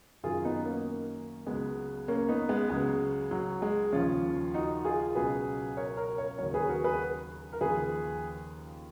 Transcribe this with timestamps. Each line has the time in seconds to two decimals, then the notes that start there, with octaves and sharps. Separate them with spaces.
0.23 F#2 D#3 F#3 F4 G#4
0.44 B3 D#4
0.65 A#3 C#4
1.46 C#2 C#3 F#3 G#3 B3
2.08 A#3 C#4
2.28 B3 D#4
2.49 G#3 B3
2.69 C#2 C#3 F#3 G#3
3.31 F#3
3.62 G#3
3.92 D#2 C#3 F3 C#4 F4
4.54 D#4 F#4
4.85 F4 G#4
5.15 C#2 B2 F#3 G#4 B4
5.77 A#4 C#5
5.97 A#4 C#5
6.18 A#4 C#5
6.38 D#2 C#3 F#3 A#4 C#5
6.54 G#4 B4
6.69 F#4 A#4
6.84 G#4 B4
7.53 A#4
7.61 D#2 C#3 F3 G#4 B4